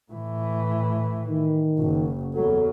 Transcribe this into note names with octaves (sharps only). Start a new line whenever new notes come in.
A2 E3
D#3
F#1
E2 F#3 A4